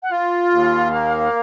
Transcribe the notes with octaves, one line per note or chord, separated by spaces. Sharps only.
F#5
F4 F5
D#2
A#3